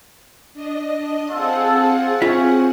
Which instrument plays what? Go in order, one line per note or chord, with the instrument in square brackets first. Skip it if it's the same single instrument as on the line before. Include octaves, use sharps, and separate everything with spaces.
[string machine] D4 D#5 D#6
[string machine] C4 G#4 F#5 [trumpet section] F4 A4
[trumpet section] C#4 [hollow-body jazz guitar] F4 E5